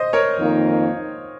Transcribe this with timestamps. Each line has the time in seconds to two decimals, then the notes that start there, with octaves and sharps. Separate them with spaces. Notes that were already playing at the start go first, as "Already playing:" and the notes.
Already playing: C5 D#5
0.13 A#4 C#5
0.38 F2 D#3 A#3 D#4